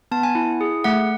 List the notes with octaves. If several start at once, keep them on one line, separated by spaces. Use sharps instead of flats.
B3 A5
G#5
E4
G#4
A3 F#5